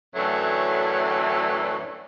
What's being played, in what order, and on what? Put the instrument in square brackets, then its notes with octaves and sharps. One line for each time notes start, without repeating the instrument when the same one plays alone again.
[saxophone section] F#2 A2 D3 E3 F#3 A3